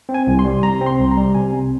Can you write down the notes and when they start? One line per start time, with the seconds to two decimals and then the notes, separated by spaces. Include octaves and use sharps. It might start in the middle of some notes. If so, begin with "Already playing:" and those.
0.09 C4
0.14 G#5
0.27 C2
0.39 C6
0.45 G3
0.63 C3 A#5
0.81 C4
0.86 C6
0.99 C2
1.11 A#5
1.17 G3
1.35 C3 G#5
1.52 C4